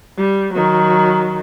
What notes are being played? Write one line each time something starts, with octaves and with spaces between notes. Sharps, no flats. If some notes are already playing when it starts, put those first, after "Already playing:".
G3
D#3 F#3